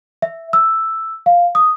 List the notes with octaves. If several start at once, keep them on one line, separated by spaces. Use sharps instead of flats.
E5
E6
F5
D#6